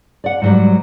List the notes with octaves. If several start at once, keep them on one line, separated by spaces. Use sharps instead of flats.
D5 F#5
G#2 F#3 G3